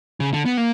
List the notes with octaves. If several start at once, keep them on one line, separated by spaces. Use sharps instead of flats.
C#3
D3
B3
A#3